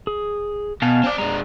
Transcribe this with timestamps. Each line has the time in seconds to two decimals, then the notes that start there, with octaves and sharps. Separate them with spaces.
0.07 G#4
0.82 B2 F5 G#5 A5
1.04 C4 D5
1.18 G#3 D4 A#5